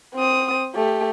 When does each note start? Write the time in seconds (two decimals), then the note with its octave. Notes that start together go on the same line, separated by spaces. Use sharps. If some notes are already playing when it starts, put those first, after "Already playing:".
0.14 C4 D#6
0.75 A3 G4